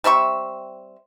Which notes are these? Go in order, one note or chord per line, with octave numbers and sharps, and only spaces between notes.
G3 C4 E5 C#6